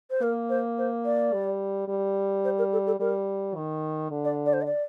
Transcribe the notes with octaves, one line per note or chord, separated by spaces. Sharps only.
C5
A#3 A#4
C5
C5
D5
G3
G3
C5
A#4
A4
A4
G3 A#4
D#3
D3
D5
D5
C5
D#5
D5